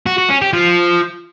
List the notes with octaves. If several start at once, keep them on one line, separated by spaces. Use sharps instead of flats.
F#4
F#4
C#4
G4
F3